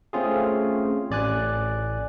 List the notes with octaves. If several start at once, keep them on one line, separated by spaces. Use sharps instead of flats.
A3 C4 C#4 F4 G#4
A1 D5 G#5 F#6